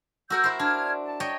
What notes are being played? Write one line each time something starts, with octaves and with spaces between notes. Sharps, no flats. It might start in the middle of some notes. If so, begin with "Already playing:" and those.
F#4 A#4 F#5 E6 G6
E4 C5
D4 F6 G#6
A5
C#5 D#5 G5